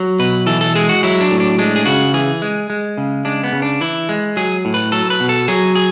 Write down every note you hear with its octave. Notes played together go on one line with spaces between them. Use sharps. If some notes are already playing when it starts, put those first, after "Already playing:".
Already playing: F#3
B2 B4
E3 A4
A4
G#3 G#4
F#4
F#3 E4
D4
A2
D4
G#3 D4
G#4
C#3 F#4
E3 G#4
G#3
G#3
C#3
G#3 D4
B3
C#3
D4
E3 E4
G#3
F#3 G#4
A2
B4
F#3 A4
B4
B2
A4
F#3 G#4
G#4